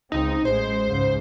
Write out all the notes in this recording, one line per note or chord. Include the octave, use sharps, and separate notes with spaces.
C#2 C4 D#4
A1 G#3 C5
C#2 G#2 C#3